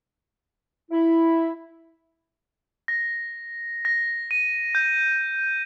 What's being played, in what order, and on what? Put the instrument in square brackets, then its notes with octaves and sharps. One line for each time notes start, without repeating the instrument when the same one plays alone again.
[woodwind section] E4
[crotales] A#6
A#6
D#7
G6